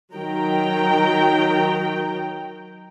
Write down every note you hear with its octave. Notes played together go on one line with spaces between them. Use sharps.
D#3 F#3 G5 A#5